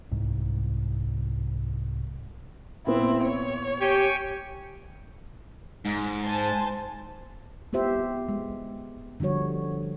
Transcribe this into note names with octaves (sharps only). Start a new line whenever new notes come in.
C2 G#2
A#2 B3 C4 E4
C#5
G4 G5 G#5 C#6
G#2
C5 G#5 A5
B3 F4 G4 C5 E5
G#3
D3 F3 G3 F#4 C#5